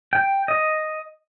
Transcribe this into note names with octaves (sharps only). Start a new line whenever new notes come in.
G5
D#5